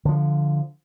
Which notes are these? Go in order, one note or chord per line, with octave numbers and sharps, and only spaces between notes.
D3 F3